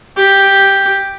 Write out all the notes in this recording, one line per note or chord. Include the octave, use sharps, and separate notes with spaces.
G4